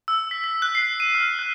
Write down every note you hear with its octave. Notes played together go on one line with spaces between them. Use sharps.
E6
B6
B6
F#6
C7
D#7
F6
F#6